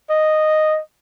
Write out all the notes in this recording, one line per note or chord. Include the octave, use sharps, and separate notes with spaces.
D#5